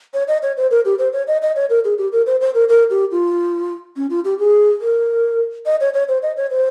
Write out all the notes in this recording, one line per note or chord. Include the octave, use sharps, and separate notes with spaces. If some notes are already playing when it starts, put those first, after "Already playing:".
C#5
D#5
C#5
C5
A#4
G4
C5
C#5
D#5
D#5
C#5
A#4
G#4
G4
A#4
C5
C5
A#4
A#4
G4
F4
C#4
F4
G4
G#4
A#4
D#5
C#5
C#5
C5
D#5
C#5
C5